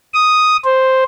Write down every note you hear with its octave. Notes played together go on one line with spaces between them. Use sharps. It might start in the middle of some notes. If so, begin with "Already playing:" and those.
D#6
C5